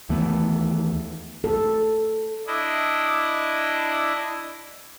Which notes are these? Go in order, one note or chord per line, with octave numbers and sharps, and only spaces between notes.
D#2 E3 A3 B3
A4
D4 E4 D#5